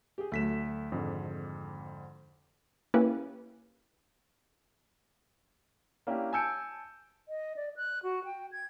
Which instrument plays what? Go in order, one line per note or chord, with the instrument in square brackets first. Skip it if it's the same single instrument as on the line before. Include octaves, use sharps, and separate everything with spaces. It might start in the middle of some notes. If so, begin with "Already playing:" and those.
[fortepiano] G4 G#4
[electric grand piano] D2 B6 E7 [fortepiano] F#3 A3
[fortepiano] G#1 [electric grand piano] F2 G#2 D3
[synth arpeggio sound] A#3 C#4 E4 G4 B4
[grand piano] A#3 C#4 D4 E4 G4
G#5 A5 E6 G6 C#7 D7
[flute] D#5
D5
F#6
F#4
G5
G#6